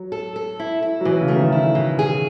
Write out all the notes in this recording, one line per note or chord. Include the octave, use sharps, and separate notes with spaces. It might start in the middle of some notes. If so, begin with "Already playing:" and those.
Already playing: F#3
A4
A4
E4
E4
F#3
B2 E3
C#3
A3
D#3
E4
B2
G#4